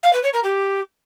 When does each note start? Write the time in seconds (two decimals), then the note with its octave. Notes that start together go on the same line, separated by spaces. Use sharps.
0.03 F5
0.13 B4
0.23 C#5
0.33 A#4
0.43 G4